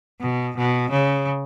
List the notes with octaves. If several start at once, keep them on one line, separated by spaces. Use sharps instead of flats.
B2
B2
C#3